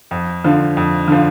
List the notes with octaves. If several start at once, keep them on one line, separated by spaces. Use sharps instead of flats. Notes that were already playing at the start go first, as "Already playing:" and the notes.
F2
D3 F3
F2
D3 F3